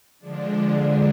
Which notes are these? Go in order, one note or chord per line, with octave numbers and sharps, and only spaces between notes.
D3 F3 G#3 D4